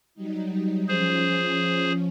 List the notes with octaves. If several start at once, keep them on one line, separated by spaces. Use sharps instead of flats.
F#3 G3 D#4
F3 C#4 G#4 C5